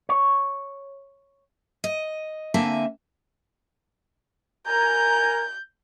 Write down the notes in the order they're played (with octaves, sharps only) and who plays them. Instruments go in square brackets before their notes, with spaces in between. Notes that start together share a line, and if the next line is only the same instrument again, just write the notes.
[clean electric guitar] C#5
[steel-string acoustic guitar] D#5
D3 A#3 C4 E5 G#5 A5
[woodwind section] A#4 G#5 A#5 [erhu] G6